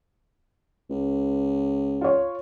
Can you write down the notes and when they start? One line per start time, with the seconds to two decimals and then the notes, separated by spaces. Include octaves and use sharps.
0.90 C#2
2.01 F4 C#5